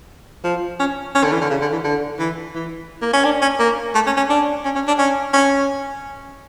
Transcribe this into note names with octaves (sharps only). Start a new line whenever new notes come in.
F3
C#4
C#4
D3
E3
D3
C#3
D3
E3
D3
E3
E3
A#3
C#4
D4
C#4
A#3
A3
C#4
C#4
D4
C#4
C#4
D4
C#4
C#4